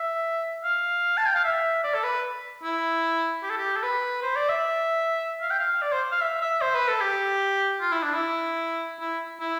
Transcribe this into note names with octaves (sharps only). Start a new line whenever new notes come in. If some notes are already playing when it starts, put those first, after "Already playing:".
Already playing: E5
F5
A5
G5
F5
E5
D5
A4
B4
E4
G4
A4
G4
A4
B4
C5
D5
E5
F5
G5
F5
D5
C5
F5
E5
E5
C5
B4
A4
G4
F4
E4
D4
E4
E4
E4